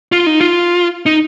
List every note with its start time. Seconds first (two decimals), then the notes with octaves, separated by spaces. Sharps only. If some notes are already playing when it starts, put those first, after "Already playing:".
0.12 F4
0.26 D#4
0.41 F4
1.06 D#4